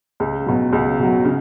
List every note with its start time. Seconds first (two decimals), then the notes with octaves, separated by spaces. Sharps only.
0.20 C#2
0.46 B2 F#3
0.73 C#2
0.99 B2 F#3
1.25 C#3